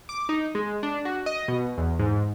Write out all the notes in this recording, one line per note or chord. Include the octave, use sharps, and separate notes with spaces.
D6
D#4
G#3
D4
F#4
D#5
B2
E2
G#2